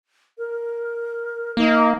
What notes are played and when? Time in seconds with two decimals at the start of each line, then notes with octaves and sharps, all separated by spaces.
0.38 A#4
1.57 A#3 D#4